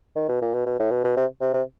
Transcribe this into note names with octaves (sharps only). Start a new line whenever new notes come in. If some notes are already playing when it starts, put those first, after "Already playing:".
D#3
B2
A#2
B2
B2
A2
B2
B2
C3
C3
C3